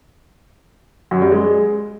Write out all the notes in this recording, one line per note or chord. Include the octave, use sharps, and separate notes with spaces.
F#2
G3
G#3